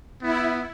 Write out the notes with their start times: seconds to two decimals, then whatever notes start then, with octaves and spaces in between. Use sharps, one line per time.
0.22 B3 E4